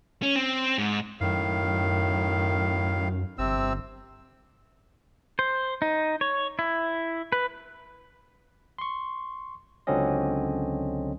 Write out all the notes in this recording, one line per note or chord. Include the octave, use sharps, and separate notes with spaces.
C#4
C4
G#2
F#2 A2 D#3 F5
G1 C3 C4 E6
C5
D#4
C#5
E4
B4
C6 C#6
C#2 D3 F#3 C4 C#4 D#5